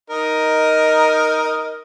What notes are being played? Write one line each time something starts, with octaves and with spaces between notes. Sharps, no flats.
D#4 A#4 D#5